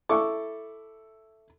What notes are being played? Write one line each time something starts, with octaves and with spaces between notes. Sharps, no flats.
E4 A4 C#6 D6